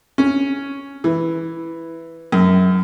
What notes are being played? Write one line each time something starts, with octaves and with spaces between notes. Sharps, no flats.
C#4
E3
F#2